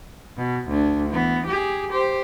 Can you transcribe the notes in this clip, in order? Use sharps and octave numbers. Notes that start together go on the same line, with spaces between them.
B2
D2 D4
E3 B3
G4 G#4
G4 C5